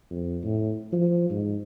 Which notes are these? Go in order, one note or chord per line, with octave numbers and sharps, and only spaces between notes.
F2
A2
F3
G#2